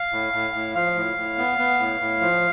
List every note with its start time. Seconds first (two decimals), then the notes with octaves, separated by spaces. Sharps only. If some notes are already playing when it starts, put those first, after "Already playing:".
Already playing: F5
0.12 A2
0.33 A2
0.54 A2
0.75 F3 F5
0.96 A2
1.17 A2
1.38 B3
1.58 B3
1.79 A2
2.01 A2
2.21 F3